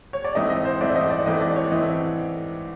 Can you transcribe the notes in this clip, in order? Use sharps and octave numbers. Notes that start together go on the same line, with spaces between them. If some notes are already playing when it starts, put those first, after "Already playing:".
C#5
D5
G#2 E3 A3 C4 D#5
D#5
C5
G#2 E3 A3 C4 D5
D#5
D5
G#2 E3 A3 C4 D#5
D5
C#5
E3 A3 C4 D#5